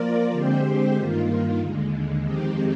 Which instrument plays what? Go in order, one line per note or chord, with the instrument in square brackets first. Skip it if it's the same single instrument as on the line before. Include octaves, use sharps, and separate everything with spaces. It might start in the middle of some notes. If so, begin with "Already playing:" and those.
Already playing: [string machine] F3 A#3 F4 A#4 D5
D3 G#3 C4 G4 C5
G2 D#3 A#3 F4
D#2 D3 G#3
F2 D#3 G#3 C4 G4